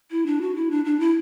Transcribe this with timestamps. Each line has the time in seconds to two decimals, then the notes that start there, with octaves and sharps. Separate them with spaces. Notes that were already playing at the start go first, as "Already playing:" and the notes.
0.11 E4
0.26 D4
0.41 F#4
0.55 E4
0.71 D4
0.85 D4
1.00 E4